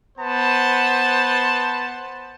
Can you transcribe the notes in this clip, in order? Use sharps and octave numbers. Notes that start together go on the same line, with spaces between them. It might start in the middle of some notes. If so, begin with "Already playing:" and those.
B3 C5 A5